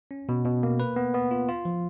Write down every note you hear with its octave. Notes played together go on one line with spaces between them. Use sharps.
C#4
B2
B2
A#3
B4
B3
B3
F4
F4
F3